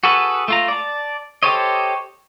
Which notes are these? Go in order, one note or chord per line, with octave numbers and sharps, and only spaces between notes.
F#4 G#4 A4 B4
A3 F4 A#5
D5 A5
G4 A4 C5 C#5 D#5